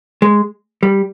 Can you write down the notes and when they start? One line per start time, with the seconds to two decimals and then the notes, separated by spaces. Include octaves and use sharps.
0.22 G#3
0.83 G3